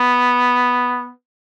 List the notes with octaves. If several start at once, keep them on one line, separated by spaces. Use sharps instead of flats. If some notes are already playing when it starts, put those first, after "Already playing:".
Already playing: B3